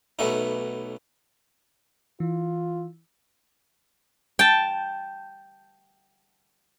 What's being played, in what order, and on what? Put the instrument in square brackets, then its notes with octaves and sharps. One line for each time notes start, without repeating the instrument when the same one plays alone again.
[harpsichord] B1 B2 A3 D#4
[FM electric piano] E3 [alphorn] F4
[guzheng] G5 A5